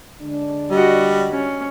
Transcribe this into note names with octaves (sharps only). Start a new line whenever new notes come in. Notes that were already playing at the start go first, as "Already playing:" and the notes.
D3 G#3 D4
G3 F#4 D#5
C#4